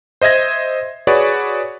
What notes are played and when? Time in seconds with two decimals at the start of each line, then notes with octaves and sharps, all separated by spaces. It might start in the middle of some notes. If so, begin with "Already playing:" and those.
0.21 C5 D#5 E5 G#6 A#6
1.07 F#4 G#4 B4 C#5 D5